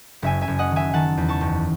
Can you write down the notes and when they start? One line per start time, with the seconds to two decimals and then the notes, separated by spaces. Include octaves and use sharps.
0.22 F#1 E5 G#5
0.41 E5 G#5
0.48 F#1
0.59 D#5 F#5
0.71 D#3
0.76 E5 G#5
0.94 D#3 F#5 A5
1.17 E2
1.29 A5 C#6
1.41 F#1